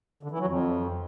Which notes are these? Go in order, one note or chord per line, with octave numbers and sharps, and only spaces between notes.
D3
E3
F#3
F2